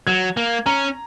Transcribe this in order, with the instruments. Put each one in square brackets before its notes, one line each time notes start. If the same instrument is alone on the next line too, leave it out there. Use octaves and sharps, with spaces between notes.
[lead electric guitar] F#3 [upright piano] G#6
[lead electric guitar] A#3
[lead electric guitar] C#4 [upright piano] A#5